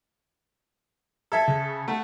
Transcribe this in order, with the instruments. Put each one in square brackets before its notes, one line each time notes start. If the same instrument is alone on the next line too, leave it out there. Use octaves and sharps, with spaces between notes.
[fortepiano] A4 E5 [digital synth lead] G#6
[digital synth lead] C#3
[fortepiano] A3 [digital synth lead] F#5